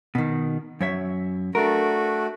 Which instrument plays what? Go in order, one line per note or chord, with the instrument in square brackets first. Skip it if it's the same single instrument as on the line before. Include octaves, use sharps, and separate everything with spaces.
[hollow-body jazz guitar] B2 D#3
F#2 C#5 E5
[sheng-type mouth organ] A3 F#4 [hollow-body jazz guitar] D4 A#4